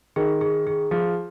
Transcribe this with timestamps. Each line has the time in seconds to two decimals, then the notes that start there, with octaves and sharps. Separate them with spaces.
0.16 D#3 G#4
0.41 G#4
0.67 G#4
0.91 F3 G#4